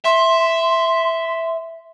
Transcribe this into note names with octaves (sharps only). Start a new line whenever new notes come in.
E5 C6